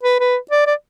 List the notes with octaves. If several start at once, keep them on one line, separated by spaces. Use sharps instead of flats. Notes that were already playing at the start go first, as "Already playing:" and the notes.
B4
B4
D5
D5